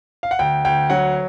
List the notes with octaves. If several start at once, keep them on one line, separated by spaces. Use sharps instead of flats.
F5
F#5
D2 G5
D2 G5
F#3 F#5